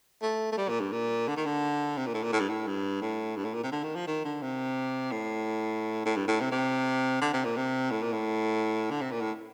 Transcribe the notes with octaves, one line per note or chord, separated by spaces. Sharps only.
A3
A3
G3
A#2
G2
A#2
D3
D#3
D3
C3
A#2
A2
A#2
A2
G2
A2
G2
A2
G2
A2
A#2
C3
D3
D#3
F3
D#3
D3
C3
A2
A2
G2
A2
C3
C3
D3
C3
A#2
C3
A2
A#2
A2
D3
C3
A#2
A2